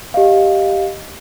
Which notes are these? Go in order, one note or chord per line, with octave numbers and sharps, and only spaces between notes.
G4 D#5 F5